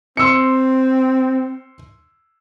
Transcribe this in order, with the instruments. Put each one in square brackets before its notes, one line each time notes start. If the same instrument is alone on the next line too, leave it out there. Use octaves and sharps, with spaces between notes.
[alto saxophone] C4 [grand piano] C6 E6 C#7